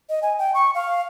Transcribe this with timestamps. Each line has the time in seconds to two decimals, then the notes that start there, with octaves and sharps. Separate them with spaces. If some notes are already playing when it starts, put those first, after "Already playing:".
0.09 D#5
0.23 G#5
0.39 G5
0.55 C#6
0.75 F5